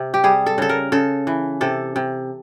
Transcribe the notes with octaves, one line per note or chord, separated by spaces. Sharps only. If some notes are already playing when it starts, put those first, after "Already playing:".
Already playing: C3
G4
G3 G#4
A4
C#3 A4
A#4
C#3 A4
E3
C3 A4
C3